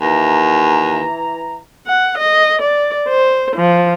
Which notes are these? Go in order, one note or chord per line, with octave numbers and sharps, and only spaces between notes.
D#2 E3 A#5
F#5
D#5
D5
C5
F3